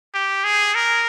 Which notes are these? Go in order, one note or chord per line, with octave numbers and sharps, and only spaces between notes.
G4
G#4
A#4